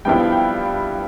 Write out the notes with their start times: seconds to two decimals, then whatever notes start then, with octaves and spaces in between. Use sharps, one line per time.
0.05 G2 F3 B3 E4 G5
0.19 F5
0.32 G5